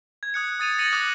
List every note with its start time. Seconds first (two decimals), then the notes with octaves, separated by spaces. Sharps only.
0.23 G#6
0.34 D#6 F#6 C#7
0.60 D#6 A6 D#7 F7
0.78 A6 A#6 C#7 D#7 F7 F#7
0.92 D6 D#6 F#6 C#7